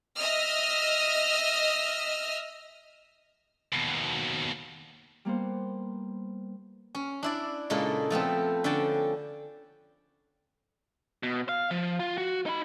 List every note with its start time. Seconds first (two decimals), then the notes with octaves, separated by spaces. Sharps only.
0.19 D#5 E5 D#6 F6
3.73 D#2 B2
5.25 G3 A#3 B3 C5
6.95 C#4
7.23 D4 E4 D5
7.70 A#2 C#3 G#3 A#3 E4 A4
8.10 F3 A3 B3 C4
8.64 D3 C#4 G5 A5
11.23 B2
11.49 F5
11.71 F3
11.99 F4
12.18 F#4
12.46 D#4 B5